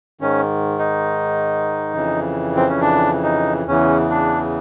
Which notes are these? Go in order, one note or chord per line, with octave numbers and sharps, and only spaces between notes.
G#2 D#3 C#4
D#4
F2 C#3 E3
C4
C#4
D4
D#4
E2 C#3 E3 C#4
D4